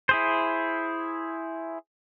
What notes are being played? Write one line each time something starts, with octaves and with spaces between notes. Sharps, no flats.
E4 G#4 C5